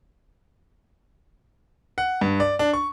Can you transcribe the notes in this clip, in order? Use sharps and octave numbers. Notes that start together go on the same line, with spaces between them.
F#5
G2
D5
D4
C#6